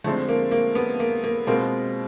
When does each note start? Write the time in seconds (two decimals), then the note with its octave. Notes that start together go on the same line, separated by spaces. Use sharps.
0.04 D3 F3 G#3 A3 C4
0.29 A#3
0.51 A#3
0.75 B3
1.00 A#3
1.24 A#3
1.47 B2 G#3 A#3 C4 F4